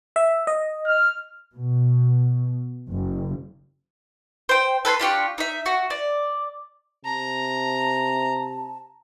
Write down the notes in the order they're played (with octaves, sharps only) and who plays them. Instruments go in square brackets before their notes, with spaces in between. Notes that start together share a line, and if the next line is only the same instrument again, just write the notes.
[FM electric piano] E5
D#5
[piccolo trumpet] F6
[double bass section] B2
F#1
[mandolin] C5 G5
A4 B4 G#5 C6
D4 F4 G4 C#6
D#4 E5
F#4
D5
[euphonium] C3 [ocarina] A5 [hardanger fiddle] A#5